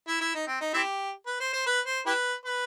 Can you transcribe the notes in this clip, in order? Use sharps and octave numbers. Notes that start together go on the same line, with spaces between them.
E4
E4
D#4
C4
D#4
C4 E4 G4
B4
C5
C5
B4
C5
E4 G4 B4
B4